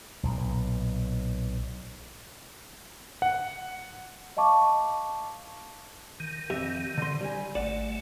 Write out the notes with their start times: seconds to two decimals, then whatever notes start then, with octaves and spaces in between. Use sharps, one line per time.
0.23 B1 A#2
3.22 F#5
4.37 D#5 F5 A5 C#6 D6
6.20 D#3
6.50 F2 G4 E5
6.98 D3 C6
7.21 G3 G#5
7.55 G#1 A3 D5 F#5